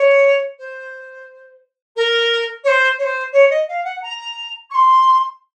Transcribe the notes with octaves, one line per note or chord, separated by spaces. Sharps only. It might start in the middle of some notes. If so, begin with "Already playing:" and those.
Already playing: C#5
C5
A#4
C#5
C5
C#5
C5
C#5
D#5
F5
F#5
A#5
C#6
C6